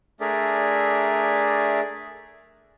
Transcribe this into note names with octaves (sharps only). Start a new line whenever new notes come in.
A3 D4 G#4 A#4 D5 E5